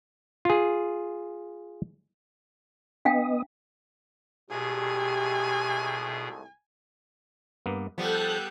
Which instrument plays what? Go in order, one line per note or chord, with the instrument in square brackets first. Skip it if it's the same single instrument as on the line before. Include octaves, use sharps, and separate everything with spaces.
[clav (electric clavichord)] F4 G#4
[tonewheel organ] B3 D#5 [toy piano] D4 F5 G5
[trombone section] C2 G#2 A3 [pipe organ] B2 G#4 [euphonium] G4 [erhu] G#5
[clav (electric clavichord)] G2 A#3 B3
[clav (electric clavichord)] F3 [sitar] G3 B3 [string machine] A4 F#6 G6